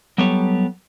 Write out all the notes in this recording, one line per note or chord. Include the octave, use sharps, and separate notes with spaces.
F#3 G3 B3 G4 A4 C#5